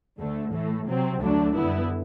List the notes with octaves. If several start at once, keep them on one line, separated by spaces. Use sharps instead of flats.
D2 D3 A3
A2 E3 A3
C3 F#3 C4
D2 D3 F#3 A3 D4
F#2 D3 G3 B3 E4